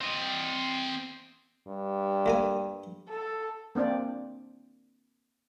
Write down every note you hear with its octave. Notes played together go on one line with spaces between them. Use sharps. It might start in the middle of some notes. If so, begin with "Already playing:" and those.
C4 D#5
G2
D2 A#3 G#5
A4
A#3 C4 D4 C5 D5